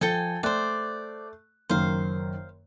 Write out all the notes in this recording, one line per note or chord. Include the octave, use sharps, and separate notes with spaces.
F3 A4 G5 G#5
A3 C5 D5 F#6
F#1 F#2 D#3 C5 F5